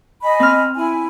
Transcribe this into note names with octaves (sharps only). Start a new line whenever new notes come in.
D#5 G#5 B5
C4 F6
E4 G#5